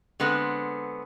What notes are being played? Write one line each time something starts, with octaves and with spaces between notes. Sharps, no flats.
D3 G#3 B3 C4